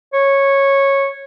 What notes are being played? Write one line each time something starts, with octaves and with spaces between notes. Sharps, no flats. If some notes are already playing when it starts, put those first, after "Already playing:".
C#5